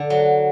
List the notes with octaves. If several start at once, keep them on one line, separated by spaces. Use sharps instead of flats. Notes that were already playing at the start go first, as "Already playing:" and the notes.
Already playing: D3
F#3